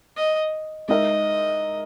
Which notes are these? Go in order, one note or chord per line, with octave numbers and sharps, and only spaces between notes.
D#5
G#3 D#4 A#4 D#5 E5